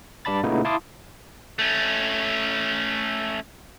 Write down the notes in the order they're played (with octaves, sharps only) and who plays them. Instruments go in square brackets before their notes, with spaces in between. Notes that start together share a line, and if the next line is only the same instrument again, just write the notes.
[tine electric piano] G2 D5 A5 B5 A6
A#2 C#3 A3 B3 D#4 E4
E4 F5 A5 C6 D6 D#6
[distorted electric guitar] A3 C#4